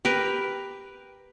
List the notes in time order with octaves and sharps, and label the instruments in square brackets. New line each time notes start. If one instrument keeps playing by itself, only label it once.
[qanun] G4 A#4 B4